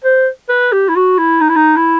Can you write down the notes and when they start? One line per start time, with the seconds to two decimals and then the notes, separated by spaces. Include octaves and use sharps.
0.04 C5
0.49 B4
0.72 G4
0.88 E4
0.96 F#4
1.18 E4
1.41 D#4
1.49 E4
1.56 D#4
1.76 E4